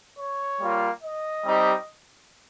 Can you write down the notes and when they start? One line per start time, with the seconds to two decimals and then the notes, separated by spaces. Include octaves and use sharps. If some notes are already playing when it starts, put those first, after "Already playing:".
0.18 C#5
0.61 G3 A#3 F4
1.03 D#5
1.45 G3 C4 D#4 G4